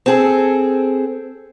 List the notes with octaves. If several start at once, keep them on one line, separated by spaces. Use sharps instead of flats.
C4 G#4 A4